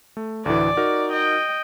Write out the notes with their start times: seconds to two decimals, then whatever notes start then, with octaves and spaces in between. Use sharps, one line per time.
0.17 A3
0.46 D2 A2 E3 D5
0.77 D#4 F#4 A#4
1.10 D#5 G5